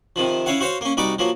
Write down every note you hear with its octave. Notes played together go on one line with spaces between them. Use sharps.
C3 D#3 F3
C#4 E4 C#5 F5 F#5
F#4 C5 C#5 F5 C6
A#3 C#4
C2 D#4 F#4 D5 B5 D6
F3 F#3 A#3